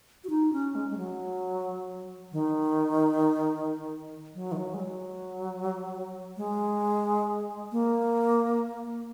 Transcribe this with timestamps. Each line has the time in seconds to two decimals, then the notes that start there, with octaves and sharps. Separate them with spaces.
0.24 F#4
0.30 D#4
0.53 C#4
0.75 G#3
0.90 G#3
0.98 F#3
2.32 D#3
4.35 F#3
4.52 D#3
4.57 F#3
4.74 G#3
4.80 F#3
6.37 G#3
7.72 A#3